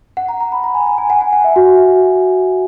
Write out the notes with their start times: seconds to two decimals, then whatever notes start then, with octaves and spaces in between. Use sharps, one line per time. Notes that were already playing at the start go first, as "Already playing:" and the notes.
0.17 F#5
0.29 A#5
0.40 A#5
0.52 B5
0.64 A#5
0.75 G#5
0.86 A#5
0.98 G#5
1.10 F#5
1.21 G#5
1.33 F#5
1.44 E5
1.56 F#4